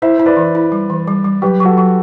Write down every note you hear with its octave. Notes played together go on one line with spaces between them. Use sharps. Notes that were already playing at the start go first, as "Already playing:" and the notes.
E4 C5 E5
E4 C5
B4 D5
E3
E4
G3
E3
G3
G3
F#3 G4 B4
F#3 F#4 A4
F#3